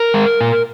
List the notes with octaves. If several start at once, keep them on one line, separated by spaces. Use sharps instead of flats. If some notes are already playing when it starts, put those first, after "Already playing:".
Already playing: A#4
G#3
A#2